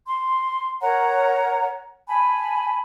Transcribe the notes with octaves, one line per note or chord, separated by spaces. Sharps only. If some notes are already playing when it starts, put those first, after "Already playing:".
C6
A#4 C#5 F#5 A#5
G#5 A5 B5